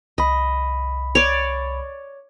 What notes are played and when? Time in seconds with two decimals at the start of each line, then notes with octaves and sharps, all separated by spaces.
0.18 C2 D#5 B5
1.15 C#5 D5